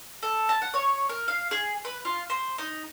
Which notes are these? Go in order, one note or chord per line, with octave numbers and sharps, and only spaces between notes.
A4
A5
F#5
C#5
A#4
F5
G#4
B4
F4
C5
D#4